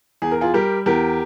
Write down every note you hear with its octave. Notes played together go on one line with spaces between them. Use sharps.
E2 G#4
A#4
F4 G#4
G3 G4 A#4
E2 G4 A#4